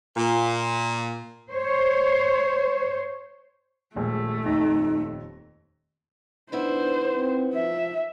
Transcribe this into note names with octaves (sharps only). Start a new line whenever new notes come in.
A#2
C5 C#5
D#1 A#1 G#3 A3
D#1 F2 D#4 A#6
D#3 B3 D4 E4 C5
C4
F3 E5